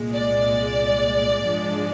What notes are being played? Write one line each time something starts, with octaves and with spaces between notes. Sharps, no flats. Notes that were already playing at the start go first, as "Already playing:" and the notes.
Already playing: C2 A#2 G#3
D5
G#2 F3 G#3 D4